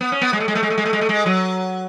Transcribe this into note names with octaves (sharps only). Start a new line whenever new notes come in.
B3
C#4
B3
G#3
A3
G#3
A3
G#3
A3
G#3
A3
G#3
A3
G#3
F#3